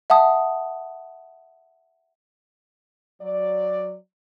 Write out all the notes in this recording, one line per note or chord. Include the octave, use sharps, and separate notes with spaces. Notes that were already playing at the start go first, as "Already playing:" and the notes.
E5 F#5 A5 D#6
F#3 D5